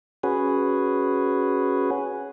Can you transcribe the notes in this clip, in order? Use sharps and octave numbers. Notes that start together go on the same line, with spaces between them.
C#4 F#4 G#4 B4